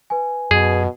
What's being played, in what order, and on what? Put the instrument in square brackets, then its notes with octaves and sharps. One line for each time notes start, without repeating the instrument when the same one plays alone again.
[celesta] B4 G#5
[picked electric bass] F#2 [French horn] B2 [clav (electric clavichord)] G#4